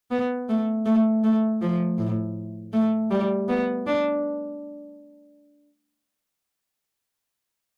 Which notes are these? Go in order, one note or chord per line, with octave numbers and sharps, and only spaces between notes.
B3
A3
A3
A3
F3
A2
A3
G3
B3
D4